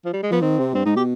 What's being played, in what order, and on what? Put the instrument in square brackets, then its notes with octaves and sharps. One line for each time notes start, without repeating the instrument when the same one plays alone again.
[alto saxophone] F3
G3
G#3
[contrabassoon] F3 [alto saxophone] B3
[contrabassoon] D#3 [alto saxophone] C4
[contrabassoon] C3
[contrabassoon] G2 [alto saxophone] C4
[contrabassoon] G#2 [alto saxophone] D#4
[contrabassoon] B2 [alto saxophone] G4